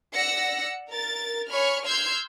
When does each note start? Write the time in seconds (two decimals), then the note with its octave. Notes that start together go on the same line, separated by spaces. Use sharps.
0.14 D5 F#5 E6 A#6 C#7
0.90 A#4 A6
1.50 C#5 G#5 B5 C#6 F6
1.86 C6 E6 F6 G6 G#6 C7